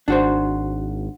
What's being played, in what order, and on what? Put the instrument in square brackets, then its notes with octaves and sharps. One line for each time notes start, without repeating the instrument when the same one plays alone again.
[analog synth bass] G#1 [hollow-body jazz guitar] D4 F#4 C5